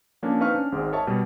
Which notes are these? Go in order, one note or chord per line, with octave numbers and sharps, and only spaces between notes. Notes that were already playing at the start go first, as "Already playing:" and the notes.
F3 A#3 C#4 D4
C4 D#4 B4 F5 C#6 F6
C#4 D4
G#1 G#2 G#3
A#4 C#5 D#5 E5 A5 C#6
B2 G3